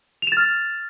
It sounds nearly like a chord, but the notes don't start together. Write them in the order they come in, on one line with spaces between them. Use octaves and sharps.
F7 E7 A6 F6